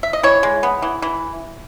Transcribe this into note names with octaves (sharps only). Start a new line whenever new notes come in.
E5
D#5
E3 C#5
G#3
B3
E3
E3